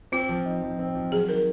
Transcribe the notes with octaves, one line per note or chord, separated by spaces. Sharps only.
C4 F4
F3
D#4
F3
C4
F3
F#3 G#4
D#3 A#4